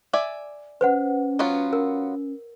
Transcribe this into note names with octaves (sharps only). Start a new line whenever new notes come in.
D5 E5 G#5
C#4 B4 C5 F#5
F#3 B3 F4
A#4